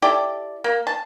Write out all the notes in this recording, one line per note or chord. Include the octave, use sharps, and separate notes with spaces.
E4 G4 A4 D5
A#3
A5